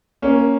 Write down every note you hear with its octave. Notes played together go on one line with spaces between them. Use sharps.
A#3 C#4